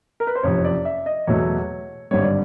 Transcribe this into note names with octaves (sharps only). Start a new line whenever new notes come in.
A#4
B4
C5
F#1 F2 C3 C#5
D5
E5
D#5
E2 B2 F#3 A3 C#5
G#1 G2 D3 G3 C#5
D5